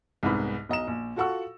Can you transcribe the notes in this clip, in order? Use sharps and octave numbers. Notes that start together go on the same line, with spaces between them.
C2 F2 G#2 B3 D#4 B5
B1 D#5 A#5 E7
A#1
F4 F#4 A4 F#5 C#6 E6